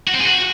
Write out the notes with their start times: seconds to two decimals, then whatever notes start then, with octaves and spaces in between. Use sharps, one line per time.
0.07 F#4
0.14 C4
0.20 G#4
0.26 F#4